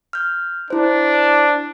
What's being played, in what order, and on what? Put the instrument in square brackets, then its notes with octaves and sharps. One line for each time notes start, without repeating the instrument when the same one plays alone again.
[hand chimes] F6 G6
[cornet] D4 [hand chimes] E4 C5